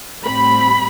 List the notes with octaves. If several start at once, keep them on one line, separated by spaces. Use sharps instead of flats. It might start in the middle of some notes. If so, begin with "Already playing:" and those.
A2 G3 C4 B5